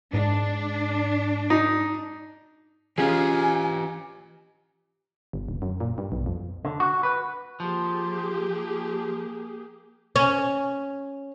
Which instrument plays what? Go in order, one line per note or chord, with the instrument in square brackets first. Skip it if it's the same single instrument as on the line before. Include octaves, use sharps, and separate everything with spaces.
[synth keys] G#2 [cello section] D4
[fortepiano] D#4
[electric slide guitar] E3 G4 [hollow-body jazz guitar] C#4 F4 G#4 [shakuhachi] G#5
[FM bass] G1
D#1
F#2
A#2
G2
B1
F2
[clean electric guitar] D3
F#4
B4
[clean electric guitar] F3 [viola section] A#3 G4 G#4
[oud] C#4